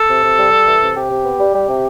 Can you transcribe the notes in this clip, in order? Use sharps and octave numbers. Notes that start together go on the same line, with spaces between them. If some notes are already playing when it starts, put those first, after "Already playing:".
Already playing: A4
C3
C3
G3
G3
E3
C3
C3 G4
C3
B3
G3
G3
C3